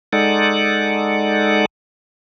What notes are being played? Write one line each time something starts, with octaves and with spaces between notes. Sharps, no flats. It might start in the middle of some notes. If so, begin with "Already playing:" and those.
G#3 D#4 A4 D5 F#5